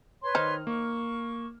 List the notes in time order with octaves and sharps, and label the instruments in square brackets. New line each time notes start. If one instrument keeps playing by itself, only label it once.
[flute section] B4 C#5 C6
[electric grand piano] D#3 D#5 F6 [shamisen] D#4 C5
[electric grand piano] A#3 [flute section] C#6